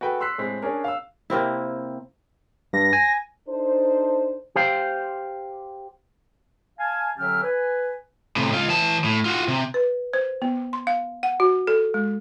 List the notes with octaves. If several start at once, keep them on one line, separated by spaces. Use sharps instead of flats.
F#4 G#4 A4 B4 G5
C6 E6 F#6 B6 C7
A2 G#3 C4 B6
C#4 D4 G#4 A#4
F5 E6
C3 A#3 C4 E4
G2 A#6
G#5
D4 D#4 A4 C5
G4 C5 F5
F5 G#5 A5
D3 F#3 C#4 G4 E5 F6
B4 G#5
A2 C3
C#2 F4
E3 A5
A2
F4 F#4
C3
B4
C5
B3
C6
F5
F#5
F#4
A4
G#3